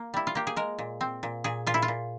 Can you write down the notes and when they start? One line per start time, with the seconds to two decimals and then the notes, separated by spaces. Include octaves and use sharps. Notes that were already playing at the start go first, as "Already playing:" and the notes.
Already playing: A#3
0.14 G3 E4
0.27 F4
0.35 A#3 G4
0.47 G#4
0.56 G#3 A#4
0.79 A#2
1.01 C4
1.23 A#2
1.44 A#2 G#4
1.67 A#2 F4
1.74 E4
1.82 F4
1.88 A#2